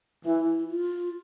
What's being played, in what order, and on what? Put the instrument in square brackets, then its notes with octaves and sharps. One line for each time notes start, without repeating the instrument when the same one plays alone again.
[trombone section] E3 [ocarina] E4
[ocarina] F4